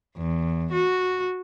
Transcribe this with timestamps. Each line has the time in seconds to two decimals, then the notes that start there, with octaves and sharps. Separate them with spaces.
0.17 E2
0.73 F#4